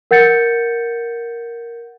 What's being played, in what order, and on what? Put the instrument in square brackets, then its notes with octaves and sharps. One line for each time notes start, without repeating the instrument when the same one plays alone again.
[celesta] A#4 F#5 G6 A6 C#7